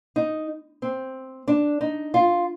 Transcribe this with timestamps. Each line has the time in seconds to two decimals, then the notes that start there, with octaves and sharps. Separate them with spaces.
0.16 D#4
0.82 C4
1.48 D4
1.81 D#4
2.14 F4